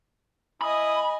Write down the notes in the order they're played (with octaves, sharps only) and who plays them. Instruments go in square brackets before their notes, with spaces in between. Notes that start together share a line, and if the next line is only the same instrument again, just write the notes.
[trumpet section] E4 D#6 [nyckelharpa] D#5 G#5 [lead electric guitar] B5